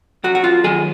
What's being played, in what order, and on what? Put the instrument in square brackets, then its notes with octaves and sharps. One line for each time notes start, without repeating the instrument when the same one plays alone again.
[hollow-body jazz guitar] F#2 F#4 F#5
F#5
F4 F5
D#3 F#3 G#4 G#5